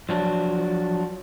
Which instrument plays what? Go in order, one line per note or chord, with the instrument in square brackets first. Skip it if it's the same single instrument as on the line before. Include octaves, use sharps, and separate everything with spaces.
[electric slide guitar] F3 F#3 D4